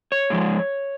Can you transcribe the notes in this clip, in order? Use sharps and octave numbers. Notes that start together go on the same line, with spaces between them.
C#5
G#2 F3 G#3